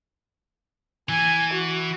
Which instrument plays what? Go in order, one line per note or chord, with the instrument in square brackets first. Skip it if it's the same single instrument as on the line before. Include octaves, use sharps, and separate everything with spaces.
[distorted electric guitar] E3 [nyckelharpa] G#5
[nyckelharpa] F#4